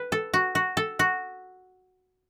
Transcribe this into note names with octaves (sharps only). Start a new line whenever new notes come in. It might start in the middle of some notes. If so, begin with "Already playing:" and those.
Already playing: B4
A4
F#4
F#4
A4
F#4